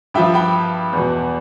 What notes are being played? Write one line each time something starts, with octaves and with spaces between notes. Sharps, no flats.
G2 F3 E5 G5
G5 B5
E2 B2